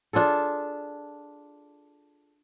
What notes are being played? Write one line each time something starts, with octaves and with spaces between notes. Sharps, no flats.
D4 F4 G#4 A4